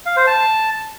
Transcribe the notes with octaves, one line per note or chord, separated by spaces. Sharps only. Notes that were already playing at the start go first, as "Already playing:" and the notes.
F5
C5
A5